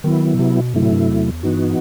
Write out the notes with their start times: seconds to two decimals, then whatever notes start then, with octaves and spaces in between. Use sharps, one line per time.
0.04 D#3 F#3 B3 E4
0.34 B2
0.39 C3
0.56 B2
0.74 G2 C3 F#3 A3 E4
0.82 A2
0.92 G2
1.09 E2
1.43 G2 E3 B3 D#4 F#4